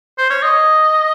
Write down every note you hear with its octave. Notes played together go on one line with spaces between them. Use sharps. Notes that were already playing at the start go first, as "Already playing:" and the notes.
C5
C#5
D#5